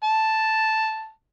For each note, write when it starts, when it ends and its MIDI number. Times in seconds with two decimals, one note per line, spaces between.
0.04 1.10 81